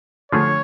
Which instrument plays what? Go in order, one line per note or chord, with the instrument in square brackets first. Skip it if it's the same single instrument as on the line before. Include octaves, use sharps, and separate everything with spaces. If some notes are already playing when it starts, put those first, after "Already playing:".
[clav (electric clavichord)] D3 F3 A3 F4 G#4 [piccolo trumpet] C#5